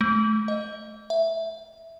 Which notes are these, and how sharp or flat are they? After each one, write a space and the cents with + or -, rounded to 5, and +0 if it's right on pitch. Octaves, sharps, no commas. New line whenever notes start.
A3 -30
D#5 -10
E5 +0